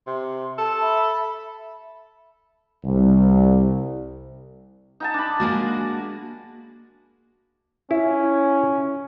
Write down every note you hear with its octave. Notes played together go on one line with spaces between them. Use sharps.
C3 C6
A4 A5
E5 B5
C2
D#4 G#5 A5
D4 B5
G#3 A#3 F#4
C#4 E4